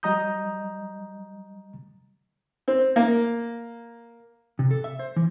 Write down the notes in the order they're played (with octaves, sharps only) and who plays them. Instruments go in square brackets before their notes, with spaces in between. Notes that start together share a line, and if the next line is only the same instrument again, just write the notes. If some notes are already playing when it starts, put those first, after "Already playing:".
[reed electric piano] F#3 G3 D#5 A#5 D#6 G6
[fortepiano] C4
A#3
[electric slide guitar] C3
A4
E5
C5
E3